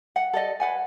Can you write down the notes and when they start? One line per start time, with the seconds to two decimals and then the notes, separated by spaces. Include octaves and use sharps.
0.16 F#5 G5
0.33 A4 D5 D#5
0.60 B4 F#5 G#5